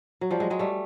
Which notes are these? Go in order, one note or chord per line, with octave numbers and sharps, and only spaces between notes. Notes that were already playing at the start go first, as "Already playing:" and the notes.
F#3
F3 G3
F#3 G#3
F#3 G#3
G3 A3